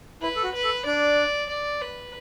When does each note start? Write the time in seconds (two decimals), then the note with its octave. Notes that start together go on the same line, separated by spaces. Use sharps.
0.21 E4 B4
0.36 A4
0.44 F#4
0.54 B4
0.64 A4
0.85 D4 D5
1.49 D5
1.81 B4